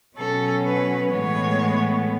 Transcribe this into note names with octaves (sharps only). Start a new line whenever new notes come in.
B2 F#3 C#4 A4
B4
A2 E3 G#3 B3 C#5